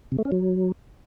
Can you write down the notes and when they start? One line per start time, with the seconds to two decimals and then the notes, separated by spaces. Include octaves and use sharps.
0.12 C3
0.18 A3
0.25 C#4
0.32 F#3